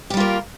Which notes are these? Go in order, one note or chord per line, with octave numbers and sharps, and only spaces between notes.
G3 A#3 F4 G4